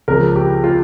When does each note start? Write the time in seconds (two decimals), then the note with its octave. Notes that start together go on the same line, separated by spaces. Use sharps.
0.08 C#2 C#3 F3 A#4
0.36 G4
0.64 F4